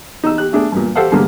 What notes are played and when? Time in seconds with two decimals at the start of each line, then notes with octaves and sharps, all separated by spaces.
0.24 D#4 E6
0.38 G4 F#6
0.53 A3 D4 G#4
0.72 G2 A#2
0.95 G4 A4 C5 F5 F#5
1.12 G2 D3 G#3 A#3